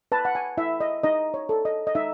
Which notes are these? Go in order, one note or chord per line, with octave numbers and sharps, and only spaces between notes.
B4 A5
F#5
G#5
E4 E5
D#5
D#4 D#5
C#5
A4
D#5
D#5
D#4 E5